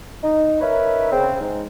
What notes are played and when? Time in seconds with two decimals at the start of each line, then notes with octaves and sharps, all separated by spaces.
0.23 D#4
0.61 C#4 D#4 A#4 B4 C#5 E5
1.11 C#3 C4
1.40 G#2